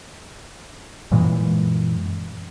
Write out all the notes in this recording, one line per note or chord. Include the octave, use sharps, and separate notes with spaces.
F#2 A#2 E3 G#3